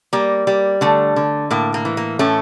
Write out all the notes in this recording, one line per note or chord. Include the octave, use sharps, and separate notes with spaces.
G3 A#3
G3
D3 A3
D3
A2 A#3
A#3
E3
A#3
A2 A3 C#4